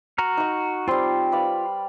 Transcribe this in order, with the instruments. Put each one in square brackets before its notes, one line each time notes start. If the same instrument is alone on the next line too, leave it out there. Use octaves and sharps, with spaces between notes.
[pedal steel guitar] F#4 A#5 F6
[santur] D#4 C#6
[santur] G3 C4 [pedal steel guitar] F4 C6
[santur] B4 D5 F5